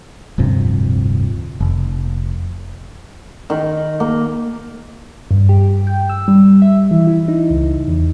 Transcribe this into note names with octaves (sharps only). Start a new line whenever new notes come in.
D1 G2 C3 F3
F1
D#3
A#3
G2
G4
G5
E6
G3
E5
E3
E4
D#4
C#2
E2